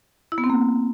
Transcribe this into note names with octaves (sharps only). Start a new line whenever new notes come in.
E4
B3
C4
A#3